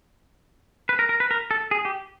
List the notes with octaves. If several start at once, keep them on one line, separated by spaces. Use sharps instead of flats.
B4
A#4
A#4
B4
A#4
A4
G#4
G4